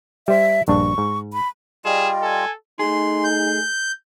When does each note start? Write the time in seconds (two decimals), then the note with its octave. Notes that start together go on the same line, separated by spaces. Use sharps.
0.28 G3 C5 E5
0.68 A#1 G2 D4 C#6
0.98 G#2
1.33 B5
1.85 G3 F4 G#4 D5 D#5 G5 E7
2.22 A4 G#5
2.79 A3 D#4 G#4 C6
3.24 G6